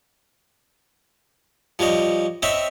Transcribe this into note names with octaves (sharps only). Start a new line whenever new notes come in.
F3 G3 C#5 D#5
C4 C#5 D#5 E5 G5 B5